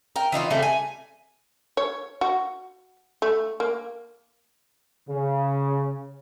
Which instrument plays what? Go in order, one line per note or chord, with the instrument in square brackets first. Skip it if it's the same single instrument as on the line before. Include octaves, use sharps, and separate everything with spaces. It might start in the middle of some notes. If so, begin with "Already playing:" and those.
[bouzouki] A#4 G5
E3 D#4 F4 D5
C#3 G3 A3 C4
G#5
[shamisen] C#5
F#4
A3
A#3
[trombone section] C#3